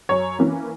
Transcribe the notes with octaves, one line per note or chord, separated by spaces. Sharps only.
F#2 C#5
E3 A#3 C#4